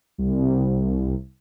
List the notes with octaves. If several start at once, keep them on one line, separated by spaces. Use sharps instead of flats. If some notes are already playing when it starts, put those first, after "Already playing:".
C2